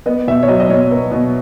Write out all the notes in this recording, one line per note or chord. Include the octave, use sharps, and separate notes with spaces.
B3 D#5
B2 E5
C#5
F#3 D#5
D#5
B2 C#5
B3
B2